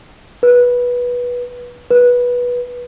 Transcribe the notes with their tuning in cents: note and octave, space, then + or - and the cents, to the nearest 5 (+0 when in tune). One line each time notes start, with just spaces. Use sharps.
B4 -15
B4 -15